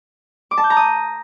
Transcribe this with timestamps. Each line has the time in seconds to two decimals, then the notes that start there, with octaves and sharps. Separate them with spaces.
0.51 D6
0.57 A5
0.64 G6
0.70 A#5
0.77 D#6